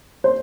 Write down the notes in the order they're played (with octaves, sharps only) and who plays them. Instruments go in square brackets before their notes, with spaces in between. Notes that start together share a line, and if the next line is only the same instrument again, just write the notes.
[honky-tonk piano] C5